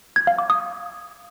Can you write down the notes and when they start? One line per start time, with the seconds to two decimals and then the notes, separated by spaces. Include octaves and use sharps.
0.16 G#6
0.27 F5
0.38 D6
0.50 D#6